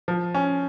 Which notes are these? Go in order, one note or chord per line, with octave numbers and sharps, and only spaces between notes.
F3
C#4